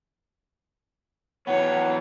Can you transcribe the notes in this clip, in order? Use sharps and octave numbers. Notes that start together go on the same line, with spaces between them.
E3 F#3 B3 C#5 F#5 G5